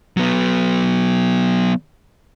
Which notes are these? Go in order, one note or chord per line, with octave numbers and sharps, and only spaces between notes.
F#3 B3